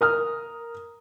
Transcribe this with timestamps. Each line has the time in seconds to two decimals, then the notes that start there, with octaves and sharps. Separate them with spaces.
0.01 A#4 D#6 F6